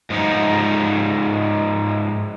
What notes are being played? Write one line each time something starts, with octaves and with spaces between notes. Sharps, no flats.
G#2 F3 D#4